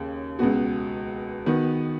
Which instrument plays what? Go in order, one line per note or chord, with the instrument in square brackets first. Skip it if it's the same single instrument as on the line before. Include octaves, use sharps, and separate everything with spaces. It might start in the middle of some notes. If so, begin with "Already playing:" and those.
Already playing: [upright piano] D#2 C#3
C#2 B2 B3 F#4
D#3 B3 F#4